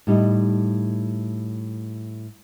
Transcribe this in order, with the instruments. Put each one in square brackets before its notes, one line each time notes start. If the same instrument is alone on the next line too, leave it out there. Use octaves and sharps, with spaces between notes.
[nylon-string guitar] A2 G3 D#4